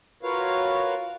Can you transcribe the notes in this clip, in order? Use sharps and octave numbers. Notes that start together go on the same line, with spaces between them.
F4 F#4 A#4 B4 C#5 F5